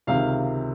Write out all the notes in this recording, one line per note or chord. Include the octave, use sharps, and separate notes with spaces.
C#2 C3 D#3 F5